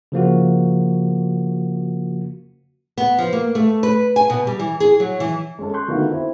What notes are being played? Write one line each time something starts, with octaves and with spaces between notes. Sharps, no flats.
C#3 F3 A#3 F#4
B3
F3
A#3
A3
B4
G#5
B2
G3
E3
G#4
F#3
E3
G#3 C#4 A4
C6 C#6 F#6 G6
D3 D#3 A3 B3 F4 F#4
C4 E4